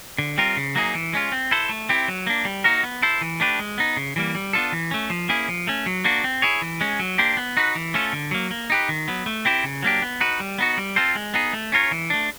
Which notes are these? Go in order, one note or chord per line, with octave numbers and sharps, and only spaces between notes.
D3
G3 C4 F4 A#4
C#3
F#3 A#3 D#4 G#4
E3
G#3 C#4 F4
C4
E4 A4 C5
A3
C4 E4 G4
F#3
A#3 D4
G3
A#3 D#4 F#4 A#4
B3
E4 A4 C5
E3
A3 D4 G4 B4
G#3
B3 D#4
C#3
E3 G3 A#3
G3
B3 D4 F4 A4
E3
A3 C#4
F3
A#3 C#4 E4 G#4
F3
A3 C#4
F#3
A#3 D4 F#4
C4
E4 G#4 C#5
E3
G#3 C#4
F#3
A#3 D4 G4 C5
B3
D#4 F#4 B4
E3
A3 C#4 F4 A4
D3
F#3 A#3
A#3
D#4 G4 B4
D#3
F#3 B3
A3
C4 E4 G4 C5
C#3
F#3 A#3 D4 G4
B3
D#4 F#4 B4
G3
B3 D#4 F#4
G3
C4 F4 A4 C5
G#3
B3 D#4 G#4
A3
C#4 F4 A#4 C#5
E3
A3 D4